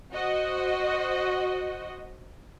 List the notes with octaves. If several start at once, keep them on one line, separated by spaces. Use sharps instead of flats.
F#4 C5 D#5